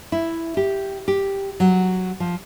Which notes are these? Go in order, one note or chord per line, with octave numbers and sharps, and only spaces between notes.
E4
G4
G4
F#3
F3